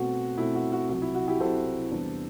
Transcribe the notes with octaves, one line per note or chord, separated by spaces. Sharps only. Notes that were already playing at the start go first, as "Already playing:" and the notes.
Already playing: B2 A3 C4 F#4
B2 A3 C4 E4
F#4
F#4
C2 C3 F#3 F#4
E4
F#4
E4 G4
C2 C3 F#3 A4 C5
E2 C3 G3 B3 D4